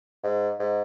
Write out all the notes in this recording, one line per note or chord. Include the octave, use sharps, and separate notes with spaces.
G#2
G#2